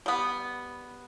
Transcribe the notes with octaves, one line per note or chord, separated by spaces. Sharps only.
G3 B3